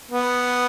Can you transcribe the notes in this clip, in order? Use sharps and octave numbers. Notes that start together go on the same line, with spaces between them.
B3